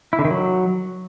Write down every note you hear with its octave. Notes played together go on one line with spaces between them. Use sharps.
E4
D3
D#3
F#3